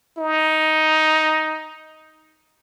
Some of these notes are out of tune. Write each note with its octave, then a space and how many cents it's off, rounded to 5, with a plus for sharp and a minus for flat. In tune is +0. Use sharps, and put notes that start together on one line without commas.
D#4 +10